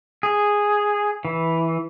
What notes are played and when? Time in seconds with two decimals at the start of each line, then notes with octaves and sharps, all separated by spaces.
0.23 G#4
1.25 E3